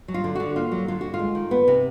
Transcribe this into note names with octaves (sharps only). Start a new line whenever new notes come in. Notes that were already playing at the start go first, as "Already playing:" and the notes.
F#3
F4
D3
D3 F#4
A#3 F4
F#3
D3 F4
D3 F#4
F4
G#3
D#3
B3
C3